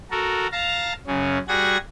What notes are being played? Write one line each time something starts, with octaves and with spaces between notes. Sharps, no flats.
F#4 A4 A#4
F5 A5 A#5
F#2 C#3 C#4
G3 F#4 G#4 F#5 G#6 A#6